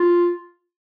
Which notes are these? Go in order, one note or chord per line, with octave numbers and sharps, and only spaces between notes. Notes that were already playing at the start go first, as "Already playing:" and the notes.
Already playing: F4